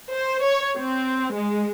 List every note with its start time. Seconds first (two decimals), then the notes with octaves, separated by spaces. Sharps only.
0.11 C5
0.43 C#5
0.78 C4
1.35 G#3